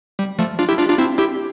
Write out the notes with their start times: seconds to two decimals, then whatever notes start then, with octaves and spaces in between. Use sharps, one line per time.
0.19 G3
0.39 F3 A3
0.59 D4 F4
0.69 E4 G4
0.79 D4 F4
0.89 D4 F4
0.98 C4 E4
1.18 E4 G4